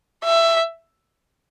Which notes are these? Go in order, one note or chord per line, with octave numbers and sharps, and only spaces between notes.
E5